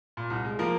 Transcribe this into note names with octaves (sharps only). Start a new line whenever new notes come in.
A#2
C2
G#3
F3 A#3 A#4